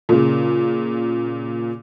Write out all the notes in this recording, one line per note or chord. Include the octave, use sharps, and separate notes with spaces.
A#2 C#3